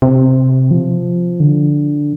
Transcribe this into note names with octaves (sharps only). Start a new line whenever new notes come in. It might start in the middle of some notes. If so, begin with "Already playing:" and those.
C3
F3
D3